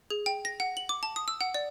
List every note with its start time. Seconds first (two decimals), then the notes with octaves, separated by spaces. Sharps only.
0.10 G#4
0.26 G5
0.45 A#6
0.60 F#5
0.77 F#7
0.89 D6
1.03 A5
1.16 D#6
1.28 E6
1.41 F#5
1.54 D5